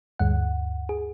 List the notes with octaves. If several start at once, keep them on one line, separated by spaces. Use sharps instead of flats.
D2 G2 F#5
G#4